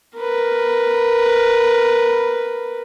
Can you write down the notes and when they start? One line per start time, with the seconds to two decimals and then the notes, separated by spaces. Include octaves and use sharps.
0.18 A#4 B4